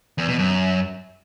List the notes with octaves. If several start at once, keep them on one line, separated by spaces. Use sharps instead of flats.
E2
B2
F#2